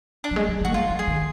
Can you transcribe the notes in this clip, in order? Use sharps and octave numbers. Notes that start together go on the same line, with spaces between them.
D4
F#3
G#3
F#3
D#3
F#4
A#3
G#3 F4
F3
G#4
D#3